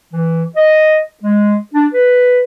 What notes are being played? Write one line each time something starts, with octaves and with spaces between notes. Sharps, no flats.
E3
D#5
G#3
D4
B4